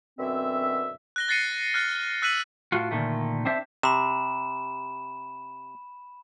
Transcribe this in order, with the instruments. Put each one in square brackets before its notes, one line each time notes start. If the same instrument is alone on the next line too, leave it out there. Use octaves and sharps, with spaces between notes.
[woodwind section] F#2 B2 D3 C4 E5
[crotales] F#6 A#6 G7
F#6 A6 A#6 C7 C#7 D#7
F6 F#6 A6
E6 F#6 B6 D#7 F#7
[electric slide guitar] A2 F4 F#4
A#2 D3 D#3 A3
C4 D4 C5 E5
[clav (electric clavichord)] C3 [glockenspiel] B5 E7